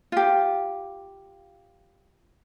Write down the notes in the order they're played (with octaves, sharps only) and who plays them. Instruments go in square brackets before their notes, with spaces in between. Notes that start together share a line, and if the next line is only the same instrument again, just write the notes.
[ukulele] F4 G4